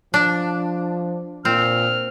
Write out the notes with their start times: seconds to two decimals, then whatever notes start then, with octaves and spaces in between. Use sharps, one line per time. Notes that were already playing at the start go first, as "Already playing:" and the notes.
0.14 F3 D4
1.45 A#2 C4 F6